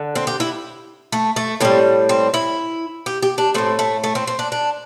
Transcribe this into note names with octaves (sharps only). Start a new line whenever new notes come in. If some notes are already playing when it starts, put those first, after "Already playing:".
Already playing: D3
C4
G4
E4
A3
A3
A2 G3 C4
C4
E4
G4
G4
D4
A2 A3 C4
A3
A3
C4
C4
D4
D4